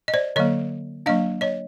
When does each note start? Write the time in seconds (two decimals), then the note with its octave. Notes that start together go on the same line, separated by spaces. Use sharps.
0.08 D#5
0.14 C5 D5
0.36 D3 F#3 A#3 C#5 D#5
1.06 F#3 A#3 D4 D#5 F5
1.41 C#5 D#5